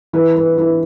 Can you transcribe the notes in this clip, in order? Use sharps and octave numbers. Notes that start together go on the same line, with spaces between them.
E3 B4
B4
E3 B4